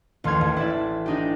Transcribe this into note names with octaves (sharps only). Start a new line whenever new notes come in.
A1 D#2 C6 F6 G#6
A1
E4 D5 E5
D4 D#4 G4